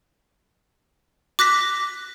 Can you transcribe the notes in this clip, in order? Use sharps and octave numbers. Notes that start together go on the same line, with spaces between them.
D6 F#6 A#6 B6